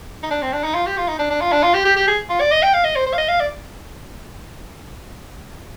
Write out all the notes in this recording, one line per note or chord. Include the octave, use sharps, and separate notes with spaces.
D#4
D4
C4
D4
D#4
F4
G4
F4
D#4
D4
D4
F4
D4
F4
G4
G4
G4
G#4
F4
D5
D#5
G5
F5
D#5
C5
C5
F5
D#5
F5
D5